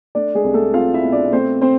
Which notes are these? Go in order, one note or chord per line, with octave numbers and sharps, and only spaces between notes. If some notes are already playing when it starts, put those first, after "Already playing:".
A3 D4 D5
G#3 G#4
C2
A3 A4
C4 F4 F5
E4 E5
B2
D4 D5
A3 C4 C5
C4 C5